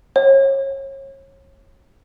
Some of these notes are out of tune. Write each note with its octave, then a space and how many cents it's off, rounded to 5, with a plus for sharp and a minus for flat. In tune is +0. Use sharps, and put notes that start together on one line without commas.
C#5 -30